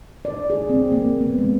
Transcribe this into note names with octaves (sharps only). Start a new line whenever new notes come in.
D5
G#4
C4
A#3
B3
G#3